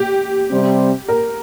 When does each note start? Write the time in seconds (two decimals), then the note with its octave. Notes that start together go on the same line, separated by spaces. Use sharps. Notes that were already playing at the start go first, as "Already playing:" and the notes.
Already playing: G4
0.51 C3 G3 C4
1.09 A#4